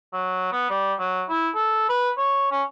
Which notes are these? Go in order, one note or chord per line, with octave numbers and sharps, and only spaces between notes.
F#3
B3
G3
F#3
E4
A4
B4
C#5
C#4